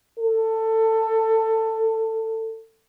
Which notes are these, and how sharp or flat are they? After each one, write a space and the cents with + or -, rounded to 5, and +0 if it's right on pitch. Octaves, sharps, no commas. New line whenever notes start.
A4 +20